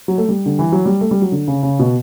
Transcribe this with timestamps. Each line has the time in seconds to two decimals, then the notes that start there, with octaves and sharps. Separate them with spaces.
0.08 F#3
0.18 A3
0.29 G3
0.46 D3
0.59 E3
0.72 F#3
0.86 G3
1.01 A3
1.11 G3
1.22 F#3
1.32 D3
1.48 C#3
1.63 C#3
1.79 B2